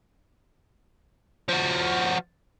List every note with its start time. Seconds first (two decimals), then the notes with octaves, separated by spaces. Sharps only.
1.49 F3 F#4